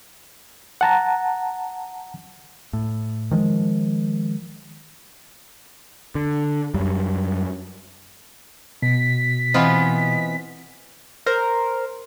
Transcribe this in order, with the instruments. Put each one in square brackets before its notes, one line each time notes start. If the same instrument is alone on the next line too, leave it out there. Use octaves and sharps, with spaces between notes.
[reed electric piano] F#5 A5 A#5
[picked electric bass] A2
D#3 F3 G#3
D3
F#2 G3
[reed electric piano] B2 [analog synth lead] B6
[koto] E3 B3 F4 [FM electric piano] C4 D#5
[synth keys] A#4 C5